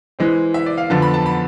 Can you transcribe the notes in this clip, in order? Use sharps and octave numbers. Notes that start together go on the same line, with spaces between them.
E3 G#3 C4
E5
D5
F5
F2 D3 F3 B3 A5
B5
A5
B5